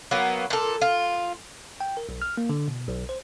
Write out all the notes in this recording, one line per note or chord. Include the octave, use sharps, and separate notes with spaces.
F#3 A#3 B3
A#2 A4
F4
G5
A#4
B1
F6
A#3
D3
B2
B1
C5